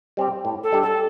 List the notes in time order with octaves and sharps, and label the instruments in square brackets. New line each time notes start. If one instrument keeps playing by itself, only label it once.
[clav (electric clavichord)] G3 C4 G4
A2
[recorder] A4
[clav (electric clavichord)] G3 D4 G4
[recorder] A4